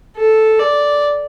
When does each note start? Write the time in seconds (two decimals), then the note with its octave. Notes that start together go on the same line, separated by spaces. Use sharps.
0.17 A4
0.59 D5